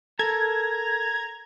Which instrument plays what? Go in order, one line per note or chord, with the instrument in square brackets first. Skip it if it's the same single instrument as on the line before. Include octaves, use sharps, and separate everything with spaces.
[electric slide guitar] A4 A#4 [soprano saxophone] A#5 [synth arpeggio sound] G#6